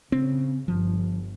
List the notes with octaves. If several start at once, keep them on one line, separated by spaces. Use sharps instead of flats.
C#3 C4
G1 F3